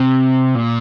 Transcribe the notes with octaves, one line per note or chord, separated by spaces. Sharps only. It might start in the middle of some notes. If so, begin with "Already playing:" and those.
Already playing: C3
A#2